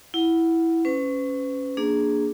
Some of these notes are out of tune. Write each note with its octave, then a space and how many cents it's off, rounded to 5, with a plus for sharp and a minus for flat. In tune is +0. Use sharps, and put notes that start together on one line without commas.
E4 +0 F#5 +0
C#4 +0 B4 +40
A#3 -5 D4 +0 G#4 +0